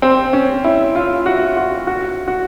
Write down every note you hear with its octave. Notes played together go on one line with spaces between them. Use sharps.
C4
C#4
E4
F4
F#4
F#4
F#4
F#4